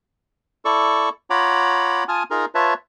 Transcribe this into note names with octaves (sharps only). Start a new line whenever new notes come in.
E4 A4 D5 C#6
F4 C#5 F#5 A#5 B5 D6
F4 G#5 A5 D#6 F6
D#4 F4 G#4 A#4 A#5
F4 B4 C#5 E5 A5